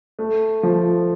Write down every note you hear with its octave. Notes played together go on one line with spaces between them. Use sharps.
A3
F3